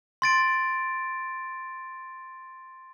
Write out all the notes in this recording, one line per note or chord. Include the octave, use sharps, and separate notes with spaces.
C6 A6 D7